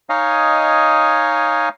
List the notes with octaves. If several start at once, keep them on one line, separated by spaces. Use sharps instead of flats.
D#4 C#5 D#5 F5 G#5